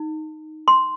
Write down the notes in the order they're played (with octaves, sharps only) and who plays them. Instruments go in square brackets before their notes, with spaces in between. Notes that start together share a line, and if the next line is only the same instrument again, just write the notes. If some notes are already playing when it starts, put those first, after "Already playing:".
Already playing: [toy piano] D#4
C6